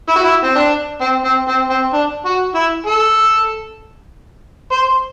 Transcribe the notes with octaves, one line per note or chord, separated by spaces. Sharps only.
E4
F#4
E4
C4
D4
C4
C4
C4
C4
D4
F#4
E4
A4
C5